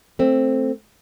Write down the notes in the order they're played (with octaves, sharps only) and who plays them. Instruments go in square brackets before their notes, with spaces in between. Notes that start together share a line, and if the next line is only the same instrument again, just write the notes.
[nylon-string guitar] A3 C4